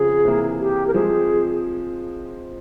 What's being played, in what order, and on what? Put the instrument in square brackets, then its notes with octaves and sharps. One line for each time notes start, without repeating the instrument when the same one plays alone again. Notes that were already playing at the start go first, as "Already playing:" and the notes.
Already playing: [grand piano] C#3 F3 C4 [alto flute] G#4
[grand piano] C3 E3 A#3 E4
[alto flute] G4
A#4
[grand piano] F3 G#3 C4 [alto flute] G#4